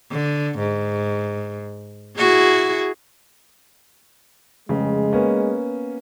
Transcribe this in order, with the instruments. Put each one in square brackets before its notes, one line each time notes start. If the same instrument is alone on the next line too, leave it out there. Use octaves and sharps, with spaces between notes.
[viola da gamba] D3
G#2
E4 F#4 G#4
[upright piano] F1 C#3 [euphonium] G#3
[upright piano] A#3 B3 C#4